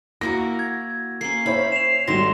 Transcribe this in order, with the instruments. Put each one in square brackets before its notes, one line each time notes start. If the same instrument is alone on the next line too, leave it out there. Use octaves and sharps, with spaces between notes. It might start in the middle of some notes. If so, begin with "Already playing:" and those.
[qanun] A#3 E4 F#4 [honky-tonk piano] A#6
[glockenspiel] G#6
[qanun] A#3 C#4 [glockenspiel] C7
[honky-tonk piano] E4 C5 C#5 [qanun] B5
[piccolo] C7 [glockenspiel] E7 F7
[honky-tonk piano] G#1 G3 [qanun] F#3 A3 [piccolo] C6 [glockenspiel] A#6 E7